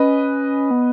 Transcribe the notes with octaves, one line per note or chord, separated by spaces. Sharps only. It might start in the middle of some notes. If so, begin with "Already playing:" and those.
Already playing: C#4 B4 D#5
B3